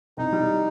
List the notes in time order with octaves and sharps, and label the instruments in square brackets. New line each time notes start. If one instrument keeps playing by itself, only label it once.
[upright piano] C2 [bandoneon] D#4
[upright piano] G3